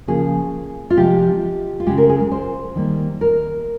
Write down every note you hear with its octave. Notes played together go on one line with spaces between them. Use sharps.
C#3 F3 A#3 G#4
F4
C3 F3 G#3 G4
F4
C#3 G#3 G4
A#4
G#4
A#4
C5
D#3 G3 A#3
A#4